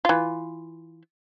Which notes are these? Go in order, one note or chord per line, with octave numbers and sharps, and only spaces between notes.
E3 F4